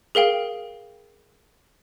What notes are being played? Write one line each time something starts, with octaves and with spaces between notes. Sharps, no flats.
G#4 A#4 F5 G5